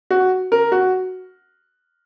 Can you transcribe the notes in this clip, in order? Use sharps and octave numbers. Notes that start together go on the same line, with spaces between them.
F#4
A#4
F#4